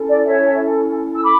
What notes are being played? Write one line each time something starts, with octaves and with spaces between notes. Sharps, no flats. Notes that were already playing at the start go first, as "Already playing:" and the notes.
Already playing: C#4 E4 A4
D5
C#5 E5
E6
B5 D6